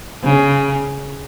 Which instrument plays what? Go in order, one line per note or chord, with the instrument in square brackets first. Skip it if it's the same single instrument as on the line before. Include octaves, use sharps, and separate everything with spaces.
[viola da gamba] C#3